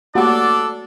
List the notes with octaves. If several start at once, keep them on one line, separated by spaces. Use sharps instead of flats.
A3 A#3 D4 F#4 G4 A4 D5